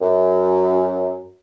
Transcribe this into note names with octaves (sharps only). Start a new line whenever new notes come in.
F#2